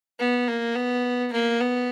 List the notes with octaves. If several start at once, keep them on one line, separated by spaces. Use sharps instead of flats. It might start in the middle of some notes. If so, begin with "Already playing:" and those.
B3
A#3
B3
A#3
B3